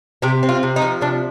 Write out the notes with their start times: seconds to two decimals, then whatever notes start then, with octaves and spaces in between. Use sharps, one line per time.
0.22 C3 G4
0.43 C4
0.49 F4
0.63 C3
0.76 D#4
0.82 F3
1.01 C3 D4